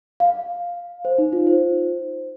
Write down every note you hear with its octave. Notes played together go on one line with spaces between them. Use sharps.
F5
C5
D#4
F4
C5